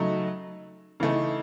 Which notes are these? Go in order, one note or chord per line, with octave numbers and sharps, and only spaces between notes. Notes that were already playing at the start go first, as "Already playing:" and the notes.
Already playing: C#3 F#3 A3 D#4
C#3 E3 A3 D#4